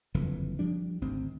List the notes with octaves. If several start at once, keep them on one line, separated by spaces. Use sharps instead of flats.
F#1 F2 D3 E3
F3 G3 D4
G#1 D2 C4